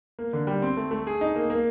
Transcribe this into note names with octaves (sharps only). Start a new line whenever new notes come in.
A#3
D3
G3
C4
A3
A3
G#4
D#4
A#3
A#3